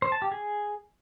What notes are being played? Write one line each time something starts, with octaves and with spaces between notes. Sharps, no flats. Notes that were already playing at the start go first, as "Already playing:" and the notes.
C5
A5
G4
G#4